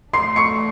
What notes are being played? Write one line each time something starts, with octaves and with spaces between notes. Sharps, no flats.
A2 E3 A3 D4 C6 C7
C#6 C#7